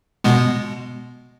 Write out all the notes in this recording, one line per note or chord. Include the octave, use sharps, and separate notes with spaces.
B2 G#3 B3